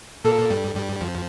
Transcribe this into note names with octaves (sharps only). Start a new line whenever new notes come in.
A#2 A#3 A4
G2 G3
G2 G3
F2 F3